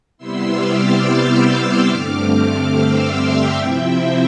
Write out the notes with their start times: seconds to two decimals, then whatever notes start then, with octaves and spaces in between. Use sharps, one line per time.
0.18 C3 G3 B3 E4 C6 E6
0.46 D6 F6
0.74 F6 A6
1.02 E6 G6
1.45 D6 F6
1.87 G2 D3 A3 C4
2.72 C6 E6
3.14 E5 G5
3.56 C3 F3 C4 E4 E5 G5
3.85 C5 E5